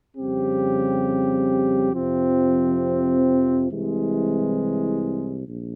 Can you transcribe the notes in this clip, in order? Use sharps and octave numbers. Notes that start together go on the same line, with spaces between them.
F2 C#3 G3 C4 G4
F2 C3 F3 C4
C2 C3 E3 G#3
A#1